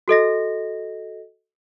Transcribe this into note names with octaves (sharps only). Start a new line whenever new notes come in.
F#4 A4 D#5 A#6